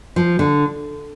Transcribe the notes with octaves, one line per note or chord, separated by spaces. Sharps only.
F3
D3